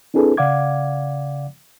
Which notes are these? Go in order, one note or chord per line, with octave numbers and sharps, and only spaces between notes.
C4 D4 E4 G#4 A4 B4
C#3 D5 F5 F#5 D6 G#6